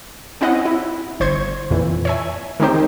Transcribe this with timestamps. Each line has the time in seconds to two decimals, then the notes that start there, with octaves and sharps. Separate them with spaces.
0.41 C4 C#4 E4 D#5 F#5
0.65 E4
1.20 G1 C5 C6 C#6 G#6
1.71 F2 A#2 E3
2.05 C#5 E5 G#5
2.60 D#3 G#3 C4 D#4 G4 C5